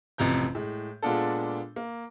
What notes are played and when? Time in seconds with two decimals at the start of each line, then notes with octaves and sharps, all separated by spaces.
0.18 A1 F2 C3 A#5 G6
0.55 A2 G#3
1.02 A#2 G#3 B3 D4 F4 A4
1.76 A#3